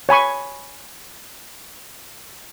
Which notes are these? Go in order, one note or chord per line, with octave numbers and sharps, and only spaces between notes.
C#5 G#5 B5 C#6